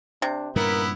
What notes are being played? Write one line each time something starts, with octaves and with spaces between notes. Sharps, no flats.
C3 D4
G2 A#2 C#3 B3 E4 A#4